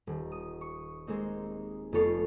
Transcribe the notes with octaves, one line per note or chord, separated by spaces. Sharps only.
D#1
D#6
C#6
G#3 A#3 C4 D#4
F1 F3 B3 A4 C#5 C7